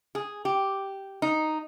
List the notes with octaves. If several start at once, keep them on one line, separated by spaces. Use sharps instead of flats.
G#4
G4
D#4